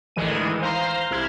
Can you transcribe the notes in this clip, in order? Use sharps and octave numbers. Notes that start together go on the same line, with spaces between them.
A1 D2 D#3 E3 G#3 D#7
C5 F5 A#5 C6
C2 E4 F6 G#6